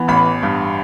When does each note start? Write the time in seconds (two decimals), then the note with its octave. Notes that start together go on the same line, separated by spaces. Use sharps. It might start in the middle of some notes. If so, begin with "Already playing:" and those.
Already playing: E3 B3
0.08 A1 B5
0.43 G2